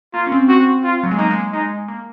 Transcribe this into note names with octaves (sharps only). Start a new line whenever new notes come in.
A#3 F4
C#4
C4
C4 F#4
F4
F#3
G#3
A#3 D#4
G#3
G#3 D#4
A#3